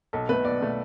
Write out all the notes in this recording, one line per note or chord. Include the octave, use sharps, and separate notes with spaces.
B1 A4
B2 A3 B4
B1 D5
B2 A3